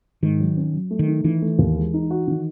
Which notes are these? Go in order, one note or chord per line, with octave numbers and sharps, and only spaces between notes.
G#2 D#3
F#3
C#4
F#3
A3
D#3
D#4
D#3 E3
A3
D#2
G#3
D#4
F#4
D#3